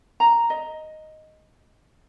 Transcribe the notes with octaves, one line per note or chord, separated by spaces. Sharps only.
A#5
D#5